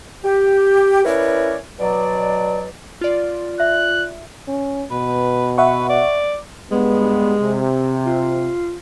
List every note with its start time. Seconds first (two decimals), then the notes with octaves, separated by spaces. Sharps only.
0.24 G4
1.05 C#4 E4 A#4 B4 C#5 D5
1.79 B2 F#3 D5
3.01 F4 D5
3.60 E5 F#6
4.48 C#4
4.91 B2 B4
5.58 B4 E5 F#5 C#6
5.89 D5
6.71 G2 G#3 B3
7.43 C3
8.06 F4